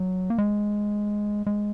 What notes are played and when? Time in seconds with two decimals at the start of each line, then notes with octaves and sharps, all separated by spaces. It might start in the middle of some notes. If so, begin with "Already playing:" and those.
Already playing: F#3
0.30 A#3
0.38 G#3
1.46 G#3